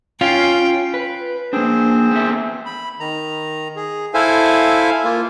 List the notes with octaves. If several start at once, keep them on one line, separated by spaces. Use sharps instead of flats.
C#4 F4 F5 G5
B4
A#3 C4 D4 G#4 C5
B3 A4 E5
B5
D#3 A#5
G#4
E4 A4 C5 E5 F5 G#5
A#3 F4